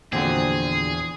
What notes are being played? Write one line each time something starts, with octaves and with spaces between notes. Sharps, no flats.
E2 A#2 D3 F3 C4 F#4 G#4